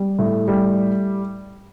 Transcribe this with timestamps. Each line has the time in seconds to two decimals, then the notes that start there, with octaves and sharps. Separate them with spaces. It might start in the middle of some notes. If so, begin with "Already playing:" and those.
Already playing: G3
0.19 A2
0.48 G3